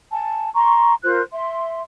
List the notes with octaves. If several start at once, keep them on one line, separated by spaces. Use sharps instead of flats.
G#5 A5
A#5 C6 C#6
F4 A#4 C5 F#6
E5 C6